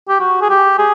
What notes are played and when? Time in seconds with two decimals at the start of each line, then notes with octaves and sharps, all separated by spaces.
0.09 G4
0.20 F#4
0.41 G#4
0.49 G4
0.78 G#4